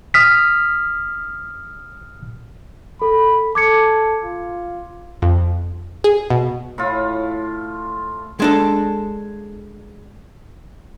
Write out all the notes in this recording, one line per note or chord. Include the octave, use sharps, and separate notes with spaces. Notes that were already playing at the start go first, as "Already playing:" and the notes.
D#6 F6 B6
A4 B5
A4 D6 G#6 C#7
F4
F2
G#4
B2
A2 F4
G#3 D4 A4